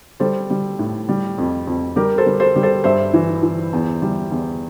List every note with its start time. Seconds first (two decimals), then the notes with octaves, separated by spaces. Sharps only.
0.20 G3 A4 C5
0.50 G3
0.79 A2
1.09 G3
1.38 F2
1.67 F2
1.96 G3 G4 A#4
2.18 A4 C5
2.26 G3
2.40 A4 C5
2.56 G3
2.63 A4 C5
2.84 G2 C5 E5
3.14 E3
3.43 E3
3.73 E2
4.02 G3
4.31 E2